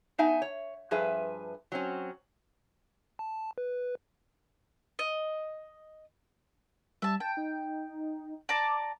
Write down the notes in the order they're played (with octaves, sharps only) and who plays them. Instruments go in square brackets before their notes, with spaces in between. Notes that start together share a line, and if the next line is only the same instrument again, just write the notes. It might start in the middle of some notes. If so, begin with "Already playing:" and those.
[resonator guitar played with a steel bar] B3 D#4 E5 G#5
C#5
G2 F3 G#4 B4 E5
F#3 C4 C#4
[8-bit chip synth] A5
B4
[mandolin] D#5
[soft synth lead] G3 [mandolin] E5 A5
[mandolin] G5 [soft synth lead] A5
[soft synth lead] D#4
[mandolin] D5 A5 A#5 [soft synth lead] D6